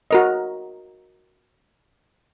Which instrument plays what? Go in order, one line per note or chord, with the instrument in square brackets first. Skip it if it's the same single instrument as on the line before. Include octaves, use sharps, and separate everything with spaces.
[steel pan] F#4 A#4 D#5